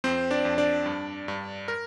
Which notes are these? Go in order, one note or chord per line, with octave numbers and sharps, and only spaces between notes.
F2 C4 C5
D4 D5
F2
D4 D5
G2
G2
A#4